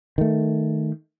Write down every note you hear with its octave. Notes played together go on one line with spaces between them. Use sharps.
D#3 A3